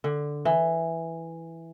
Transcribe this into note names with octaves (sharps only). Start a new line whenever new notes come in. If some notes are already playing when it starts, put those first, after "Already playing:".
D3
E3